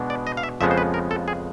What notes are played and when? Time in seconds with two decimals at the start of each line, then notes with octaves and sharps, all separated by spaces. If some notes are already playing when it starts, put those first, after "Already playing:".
Already playing: B2 G#3 B3 D4
0.10 D5
0.27 D#5
0.37 F5
0.43 E5
0.61 F2 C#3 F3 G#3 B3 E5
0.71 C5
0.78 B4
0.94 A#4
1.11 A4
1.28 G#4